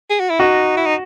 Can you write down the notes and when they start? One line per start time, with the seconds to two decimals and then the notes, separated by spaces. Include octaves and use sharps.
0.10 G#4
0.20 F#4
0.30 E4
0.40 D#4 F#4
0.77 E4
0.86 D#4